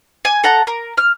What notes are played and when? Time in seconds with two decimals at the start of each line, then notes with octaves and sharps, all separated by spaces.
0.25 G#5
0.44 A4 F#5 A#5
0.67 A#4
0.97 F6